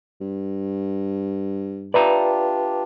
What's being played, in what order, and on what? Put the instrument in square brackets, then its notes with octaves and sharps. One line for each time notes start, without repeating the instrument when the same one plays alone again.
[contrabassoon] G2
[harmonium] D4 F4 G4 [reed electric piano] B4 [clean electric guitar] D5 E5 A#5